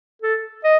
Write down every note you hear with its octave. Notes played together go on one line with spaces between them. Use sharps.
A4
D#5